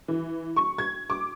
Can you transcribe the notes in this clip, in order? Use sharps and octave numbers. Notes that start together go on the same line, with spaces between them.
E3
C#6
G#6
D6